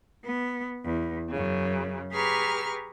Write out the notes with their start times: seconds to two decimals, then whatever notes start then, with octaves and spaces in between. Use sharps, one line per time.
0.24 B3
0.84 E2
1.29 F#2 C#3
2.11 G4 G#4 B4 A#5 C#6 F6